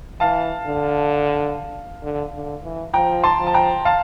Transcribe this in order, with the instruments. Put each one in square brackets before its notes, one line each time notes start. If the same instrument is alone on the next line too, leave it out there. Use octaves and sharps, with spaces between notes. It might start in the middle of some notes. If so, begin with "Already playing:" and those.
[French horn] E3 [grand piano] F5 A5
[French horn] D3
D3
D3
E3
[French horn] F3 [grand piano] G5 A#5
[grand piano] A5 C6
[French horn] F3
[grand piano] A5
G5 A#5
F5 A5